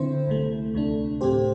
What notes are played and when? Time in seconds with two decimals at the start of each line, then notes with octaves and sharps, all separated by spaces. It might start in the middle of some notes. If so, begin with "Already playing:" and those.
Already playing: D3 C4 E4 C5
0.27 C2 C3 A3
0.74 D2 C3 A3 D4
1.21 A2 A3 C4 G4 C5